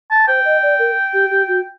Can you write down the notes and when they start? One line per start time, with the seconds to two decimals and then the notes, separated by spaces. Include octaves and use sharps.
0.11 A5
0.28 C5 G5
0.45 D#5
0.62 D5
0.79 A#4
1.13 G4
1.31 G4
1.48 F#4